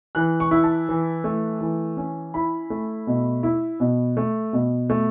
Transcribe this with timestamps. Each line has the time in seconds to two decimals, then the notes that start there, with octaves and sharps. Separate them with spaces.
0.15 E3 F#6
0.40 C#6
0.51 E4
0.64 A5
0.89 E3
1.24 A3
1.61 E3
1.97 C#4
2.34 E4 B5
2.70 A3
3.07 B2
3.43 E4
3.80 B2
4.17 A3
4.53 B2
4.90 A3